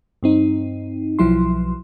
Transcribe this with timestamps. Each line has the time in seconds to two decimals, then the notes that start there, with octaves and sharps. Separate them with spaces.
0.23 G2 C4 D#4
1.19 B1 F3 F#3 E4 C6